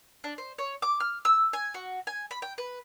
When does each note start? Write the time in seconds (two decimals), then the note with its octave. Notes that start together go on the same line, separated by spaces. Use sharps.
0.24 D4
0.38 C5
0.58 C#5
0.82 D6
1.00 F6
1.25 E6
1.53 G#5
1.74 F#4
2.07 G#5
2.31 B5
2.42 G5
2.58 B4